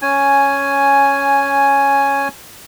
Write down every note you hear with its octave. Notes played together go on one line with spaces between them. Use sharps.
C#4 G#5